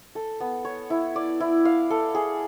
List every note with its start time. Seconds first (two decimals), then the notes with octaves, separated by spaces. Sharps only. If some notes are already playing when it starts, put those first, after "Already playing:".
0.15 A4
0.40 B3
0.65 C#5
0.90 E4
1.16 D5
1.40 E4
1.65 F5
1.90 A4
2.15 G#4